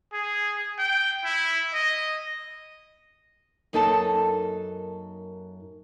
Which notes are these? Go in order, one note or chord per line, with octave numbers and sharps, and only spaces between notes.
G#4
G5
E4
D#5
F#2 A#3 D#4 A4 G5 A5